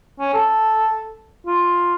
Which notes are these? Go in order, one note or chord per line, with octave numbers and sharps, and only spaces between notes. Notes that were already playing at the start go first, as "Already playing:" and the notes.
C#4
A4
F4